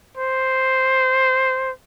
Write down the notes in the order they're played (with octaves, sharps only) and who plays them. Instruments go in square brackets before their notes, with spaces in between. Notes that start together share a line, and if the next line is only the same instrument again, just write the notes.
[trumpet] C5